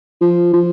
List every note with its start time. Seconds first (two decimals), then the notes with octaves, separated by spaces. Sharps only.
0.21 F3
0.53 F3